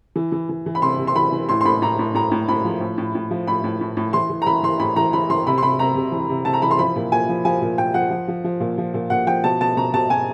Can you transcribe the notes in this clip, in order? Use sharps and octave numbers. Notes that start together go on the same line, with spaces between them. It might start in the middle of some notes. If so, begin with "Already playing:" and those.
E3
E3
E3
E3
B5
C3 C6
C3
C6
E3 B5
E3
A2 C6
C6
A2 B5
A2 A#5
A2
A2 A#5
A2
A2 B5
F3
A2
A2
A2
F3
A2 B5
A2
A2
A2
E3 C6
E3
A#5
E3 B5
E3 C6
A2 B5
E3 A#5
E3 B5
E3 C6
C3 B5
C6
C3 B5
C3 A#5
C3
E3
C3
C3 A5
A#5
E3 B5
C6
F3 B5
A#2
A#2 G#5
F3
F3 G#5
A#2
A#2 G5
F3 F#5
F3
F3
F3
A#2
F3
A#2
A#2 F#5
F3 G5
B2 A5
B2 A5
B2 A#5
B2 A5
B2 G#5